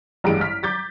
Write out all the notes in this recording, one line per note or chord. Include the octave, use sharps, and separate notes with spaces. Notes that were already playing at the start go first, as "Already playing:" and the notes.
A1 G2 G3 G#3 D7
F6 B6
D6 G6 A6 B6